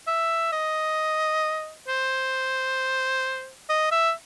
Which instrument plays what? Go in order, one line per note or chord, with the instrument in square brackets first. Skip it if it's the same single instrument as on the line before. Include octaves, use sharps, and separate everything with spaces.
[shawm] E5
D#5
C5
D#5
E5